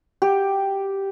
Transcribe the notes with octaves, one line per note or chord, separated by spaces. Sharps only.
G4